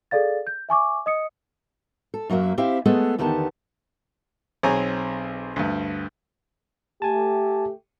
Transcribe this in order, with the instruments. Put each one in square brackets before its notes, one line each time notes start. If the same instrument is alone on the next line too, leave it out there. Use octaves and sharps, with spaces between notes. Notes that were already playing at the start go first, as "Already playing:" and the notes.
[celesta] G#4 A4 D5 F5 A6
G6
E5 G#5 C#6 D6
D#5 D#6 C#7
[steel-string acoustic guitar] A4
F#2 F#3 A#3 E5
C4 E4 G4 C5 E5 F5
G#3 A3 B3 G#4 A4
E2 D3 D#3 B3 G4 A5
[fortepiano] B1 C4 G#4 C#5 G#5 A#5
D2 G2
[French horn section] A3 G4 [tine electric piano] G#5 A5